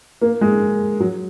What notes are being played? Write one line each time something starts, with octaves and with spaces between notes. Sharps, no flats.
A#3
G#3
F#3